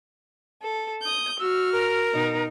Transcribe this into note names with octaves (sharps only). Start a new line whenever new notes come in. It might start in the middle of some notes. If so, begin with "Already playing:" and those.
A4
D#6 G6
F#4 E6 F6
A#4
B2 D#4